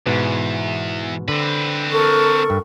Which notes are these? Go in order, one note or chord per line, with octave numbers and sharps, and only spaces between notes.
E2 G#2 B2 B4
D3 C4 B4
A4 A#4 C#6
G2